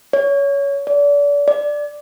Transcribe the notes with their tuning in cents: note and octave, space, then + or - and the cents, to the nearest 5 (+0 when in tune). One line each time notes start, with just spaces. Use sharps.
C#5 +20
D5 -35
D5 +0